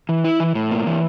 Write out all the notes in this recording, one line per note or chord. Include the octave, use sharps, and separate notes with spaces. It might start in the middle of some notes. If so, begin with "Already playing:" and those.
E3
E4
E3
A2
A#3
E3